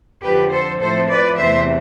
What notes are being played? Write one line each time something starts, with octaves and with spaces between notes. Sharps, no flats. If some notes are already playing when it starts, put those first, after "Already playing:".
F2 D3 F3 G4 B4
A4 C5
A2 F3 A3 C4 A4 C5
B4 D5
E2 C3 E3 A3 C4 C5 E5